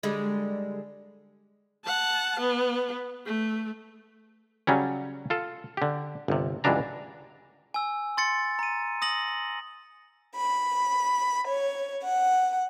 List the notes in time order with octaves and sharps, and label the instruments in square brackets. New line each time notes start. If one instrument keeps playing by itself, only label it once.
[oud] D3 G3 G#3
[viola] F#5 A5
B3
A3
[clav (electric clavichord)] C#3 F#3 G3 C#4
F4 A4
D3 G4
G1 C3
C#2 G2 E3 F#3 D4 A#5
[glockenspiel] G#5 E6
C6 A6 C#7
A#5 D#7
D#6 A#6 F#7
[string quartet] B5
C#5
F#5